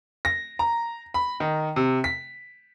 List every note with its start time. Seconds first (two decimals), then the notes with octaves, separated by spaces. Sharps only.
0.25 A#6
0.59 A#5
1.14 B5
1.40 D#3
1.76 C3
2.04 B6